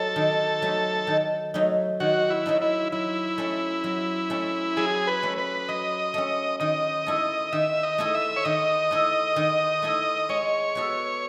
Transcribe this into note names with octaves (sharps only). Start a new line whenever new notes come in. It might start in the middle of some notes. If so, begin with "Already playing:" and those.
Already playing: F#3 A3 D#4 A4
D#3
F#3 A3 D#4
D#3
F#3 A3 D#4
D#3 F#4
E4
F#3 A3 D#4
E4
F#3 E4
A3 C#4
F#3
A3 C#4
F#3 G#4
B4
A3 C#4
B4
F#3 D#5
A3 C#4
D#3 D#5
A3 E4 A4
D#3 E5
D#5
A3 E4 A4
E5
C#5
D#3 D#5
A3 E4 A4
D#3
A3 E4 A4
G#3 C#5
B3 F#4 A4